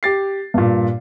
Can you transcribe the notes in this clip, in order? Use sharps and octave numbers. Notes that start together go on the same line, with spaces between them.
G4 A6 C7
G2 A#2